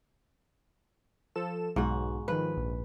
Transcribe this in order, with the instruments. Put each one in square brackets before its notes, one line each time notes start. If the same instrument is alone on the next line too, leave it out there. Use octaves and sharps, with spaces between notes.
[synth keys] F3 A4 E7
[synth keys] B1 [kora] G#2 F#4
[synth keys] D#3 F3 [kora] B4
[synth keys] A#1